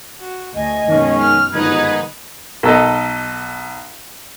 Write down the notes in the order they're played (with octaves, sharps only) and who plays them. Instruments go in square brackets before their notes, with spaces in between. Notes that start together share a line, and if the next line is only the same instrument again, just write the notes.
[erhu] F#4
[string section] D2 [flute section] D#5 [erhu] G#5
[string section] F#2 B2 [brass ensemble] D#3 G#3 C#4
[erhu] F6
[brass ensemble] G1 G#2 D#5 [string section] D#3 D#4 [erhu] B4 [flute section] G#6
[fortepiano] B1 A4 D#5